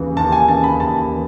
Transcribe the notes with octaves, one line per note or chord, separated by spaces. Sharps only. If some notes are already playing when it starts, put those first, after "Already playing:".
Already playing: D#2 C#3 E3
D#2 A5
G#5
C#3 E3 A5
B5
D#2 A5
E3